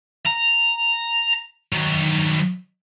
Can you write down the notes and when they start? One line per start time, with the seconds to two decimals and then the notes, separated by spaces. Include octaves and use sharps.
0.26 A#5
1.72 D#3 F#3